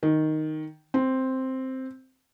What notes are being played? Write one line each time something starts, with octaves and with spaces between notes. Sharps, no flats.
D#3
C4